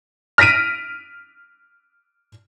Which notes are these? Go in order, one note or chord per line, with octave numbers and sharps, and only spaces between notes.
F6 A#6 B6 D7 D#7